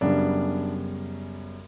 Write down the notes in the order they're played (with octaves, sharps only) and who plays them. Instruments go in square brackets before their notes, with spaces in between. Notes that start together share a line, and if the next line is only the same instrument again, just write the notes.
[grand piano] F#2 C#3 G3 B3 D4